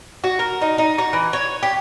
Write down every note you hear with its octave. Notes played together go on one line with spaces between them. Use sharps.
F#4
A#4
D#4
D#4
F#4
E3
C#5
G4